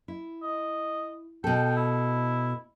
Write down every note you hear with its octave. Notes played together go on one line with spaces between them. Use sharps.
E4
D#5
B2 A4 G5
E4